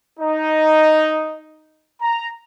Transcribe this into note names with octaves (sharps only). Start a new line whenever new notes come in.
D#4
A#5